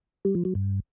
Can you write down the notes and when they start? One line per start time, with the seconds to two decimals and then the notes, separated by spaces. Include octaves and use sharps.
0.25 G3
0.35 F3
0.45 F#3
0.55 G2